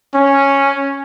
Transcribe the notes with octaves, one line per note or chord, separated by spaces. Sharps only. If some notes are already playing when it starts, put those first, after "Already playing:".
C#4